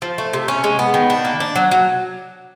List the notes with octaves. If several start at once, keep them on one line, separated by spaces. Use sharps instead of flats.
F3
A3
C3
C#4
G#3
B3
D#3
D4
A#3
D4
F#3
F#3